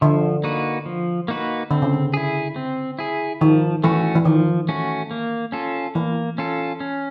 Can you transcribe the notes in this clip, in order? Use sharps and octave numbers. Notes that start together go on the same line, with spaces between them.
D3 F3
A#3 D#4 F#4 B4
F3
A#3 D#4 F#4 B4
D3 C4
C#3
D3
E4 G#4
C4
E4 G#4
D#3 F3
E3 A3 C#4 F#4
E3
D#3 F3
A3 C#4 F#4
A#3
C#4 F4 A4
E3 A#3
C#4 F4 A4
C#4